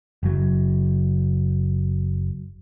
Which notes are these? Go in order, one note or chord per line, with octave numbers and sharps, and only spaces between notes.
F#1 F#3